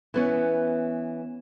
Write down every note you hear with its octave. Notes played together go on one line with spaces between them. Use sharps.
E3 B3 C#4